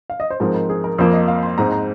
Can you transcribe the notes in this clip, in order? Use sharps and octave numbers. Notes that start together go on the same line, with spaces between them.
F5
D#5
C5
G#2 F3 G#3 C4 A#4
A#4
G#4
A#4
F2 F3 A#3 C5
D#5
F5
C6
G#2 G#3 C4 A#5
A#5